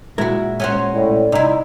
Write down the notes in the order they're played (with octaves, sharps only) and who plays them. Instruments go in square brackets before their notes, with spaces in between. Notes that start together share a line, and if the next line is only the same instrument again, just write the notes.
[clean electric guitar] A#2 G#3 A#4 [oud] E4 F#4 [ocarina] E5
[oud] C#4 F#4 C5
[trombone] A2 [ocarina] D5
[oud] C3 E4 [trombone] D#4